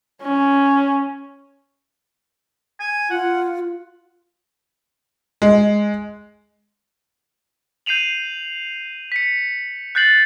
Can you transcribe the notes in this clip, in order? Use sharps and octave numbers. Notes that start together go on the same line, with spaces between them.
C#4
G#5
F4 F#5
G#3
G6 C7 D#7 F7 F#7
B6 C#7
F#6 G6 A6 C7 F#7